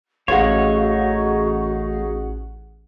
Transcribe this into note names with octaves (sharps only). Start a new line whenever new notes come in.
A1 A3 D#4 F#4 G#4 C#5 F5 F#5